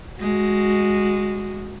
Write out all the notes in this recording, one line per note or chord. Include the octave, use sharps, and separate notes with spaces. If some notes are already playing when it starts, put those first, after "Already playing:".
G#3 F#4